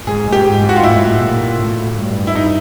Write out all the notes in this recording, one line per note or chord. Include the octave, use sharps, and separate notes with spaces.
G#2 G#4
A2
G#2 G4
G#2
F#4
F4
A2 E4
G#2
A2
A#2
A2
G2
E4
D#4